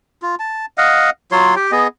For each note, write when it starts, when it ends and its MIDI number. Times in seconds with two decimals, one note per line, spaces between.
0.22 0.35 65
0.39 0.66 81
0.78 1.10 75
0.78 1.10 77
0.78 1.10 78
1.32 1.55 54
1.32 1.55 65
1.32 1.55 73
1.32 1.55 84
1.56 1.71 67
1.56 1.71 79
1.72 1.87 59
1.72 1.87 68
1.72 1.87 75